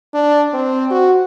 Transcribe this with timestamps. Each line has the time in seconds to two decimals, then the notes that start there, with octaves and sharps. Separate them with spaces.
0.14 D4
0.54 C4
0.91 F#4